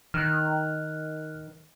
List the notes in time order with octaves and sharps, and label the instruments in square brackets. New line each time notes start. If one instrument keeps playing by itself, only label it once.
[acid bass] D#3 [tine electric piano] F6 F#6